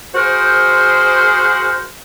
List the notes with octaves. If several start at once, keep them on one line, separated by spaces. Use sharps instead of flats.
F#4 G#4 A#4 C5